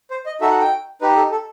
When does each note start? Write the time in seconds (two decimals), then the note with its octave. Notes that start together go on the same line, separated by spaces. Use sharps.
0.11 C5
0.26 D#5
0.41 D#4 F#4 A4 E5
0.51 F#5
0.61 G5
1.01 D#4 G4 B4
1.16 A4
1.31 A4